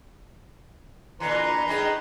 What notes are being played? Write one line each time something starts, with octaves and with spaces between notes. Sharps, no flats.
A#2 D3 E3 B4 A#5 C6
A2 G#3 D#4